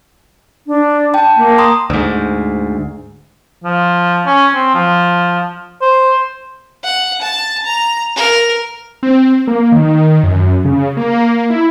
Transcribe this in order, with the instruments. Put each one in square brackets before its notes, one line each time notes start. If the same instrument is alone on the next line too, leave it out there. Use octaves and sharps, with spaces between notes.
[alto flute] D4
[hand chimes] G5 A5
[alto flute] A#3
[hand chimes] A#5 C6 D#6
[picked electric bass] D2 G#2
[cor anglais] F3
C#4
C4
F3
C5
[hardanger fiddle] F#5
A5
A#5
A#4
[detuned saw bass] C4
A#3
D#3
F#2
C#3
A#3
E4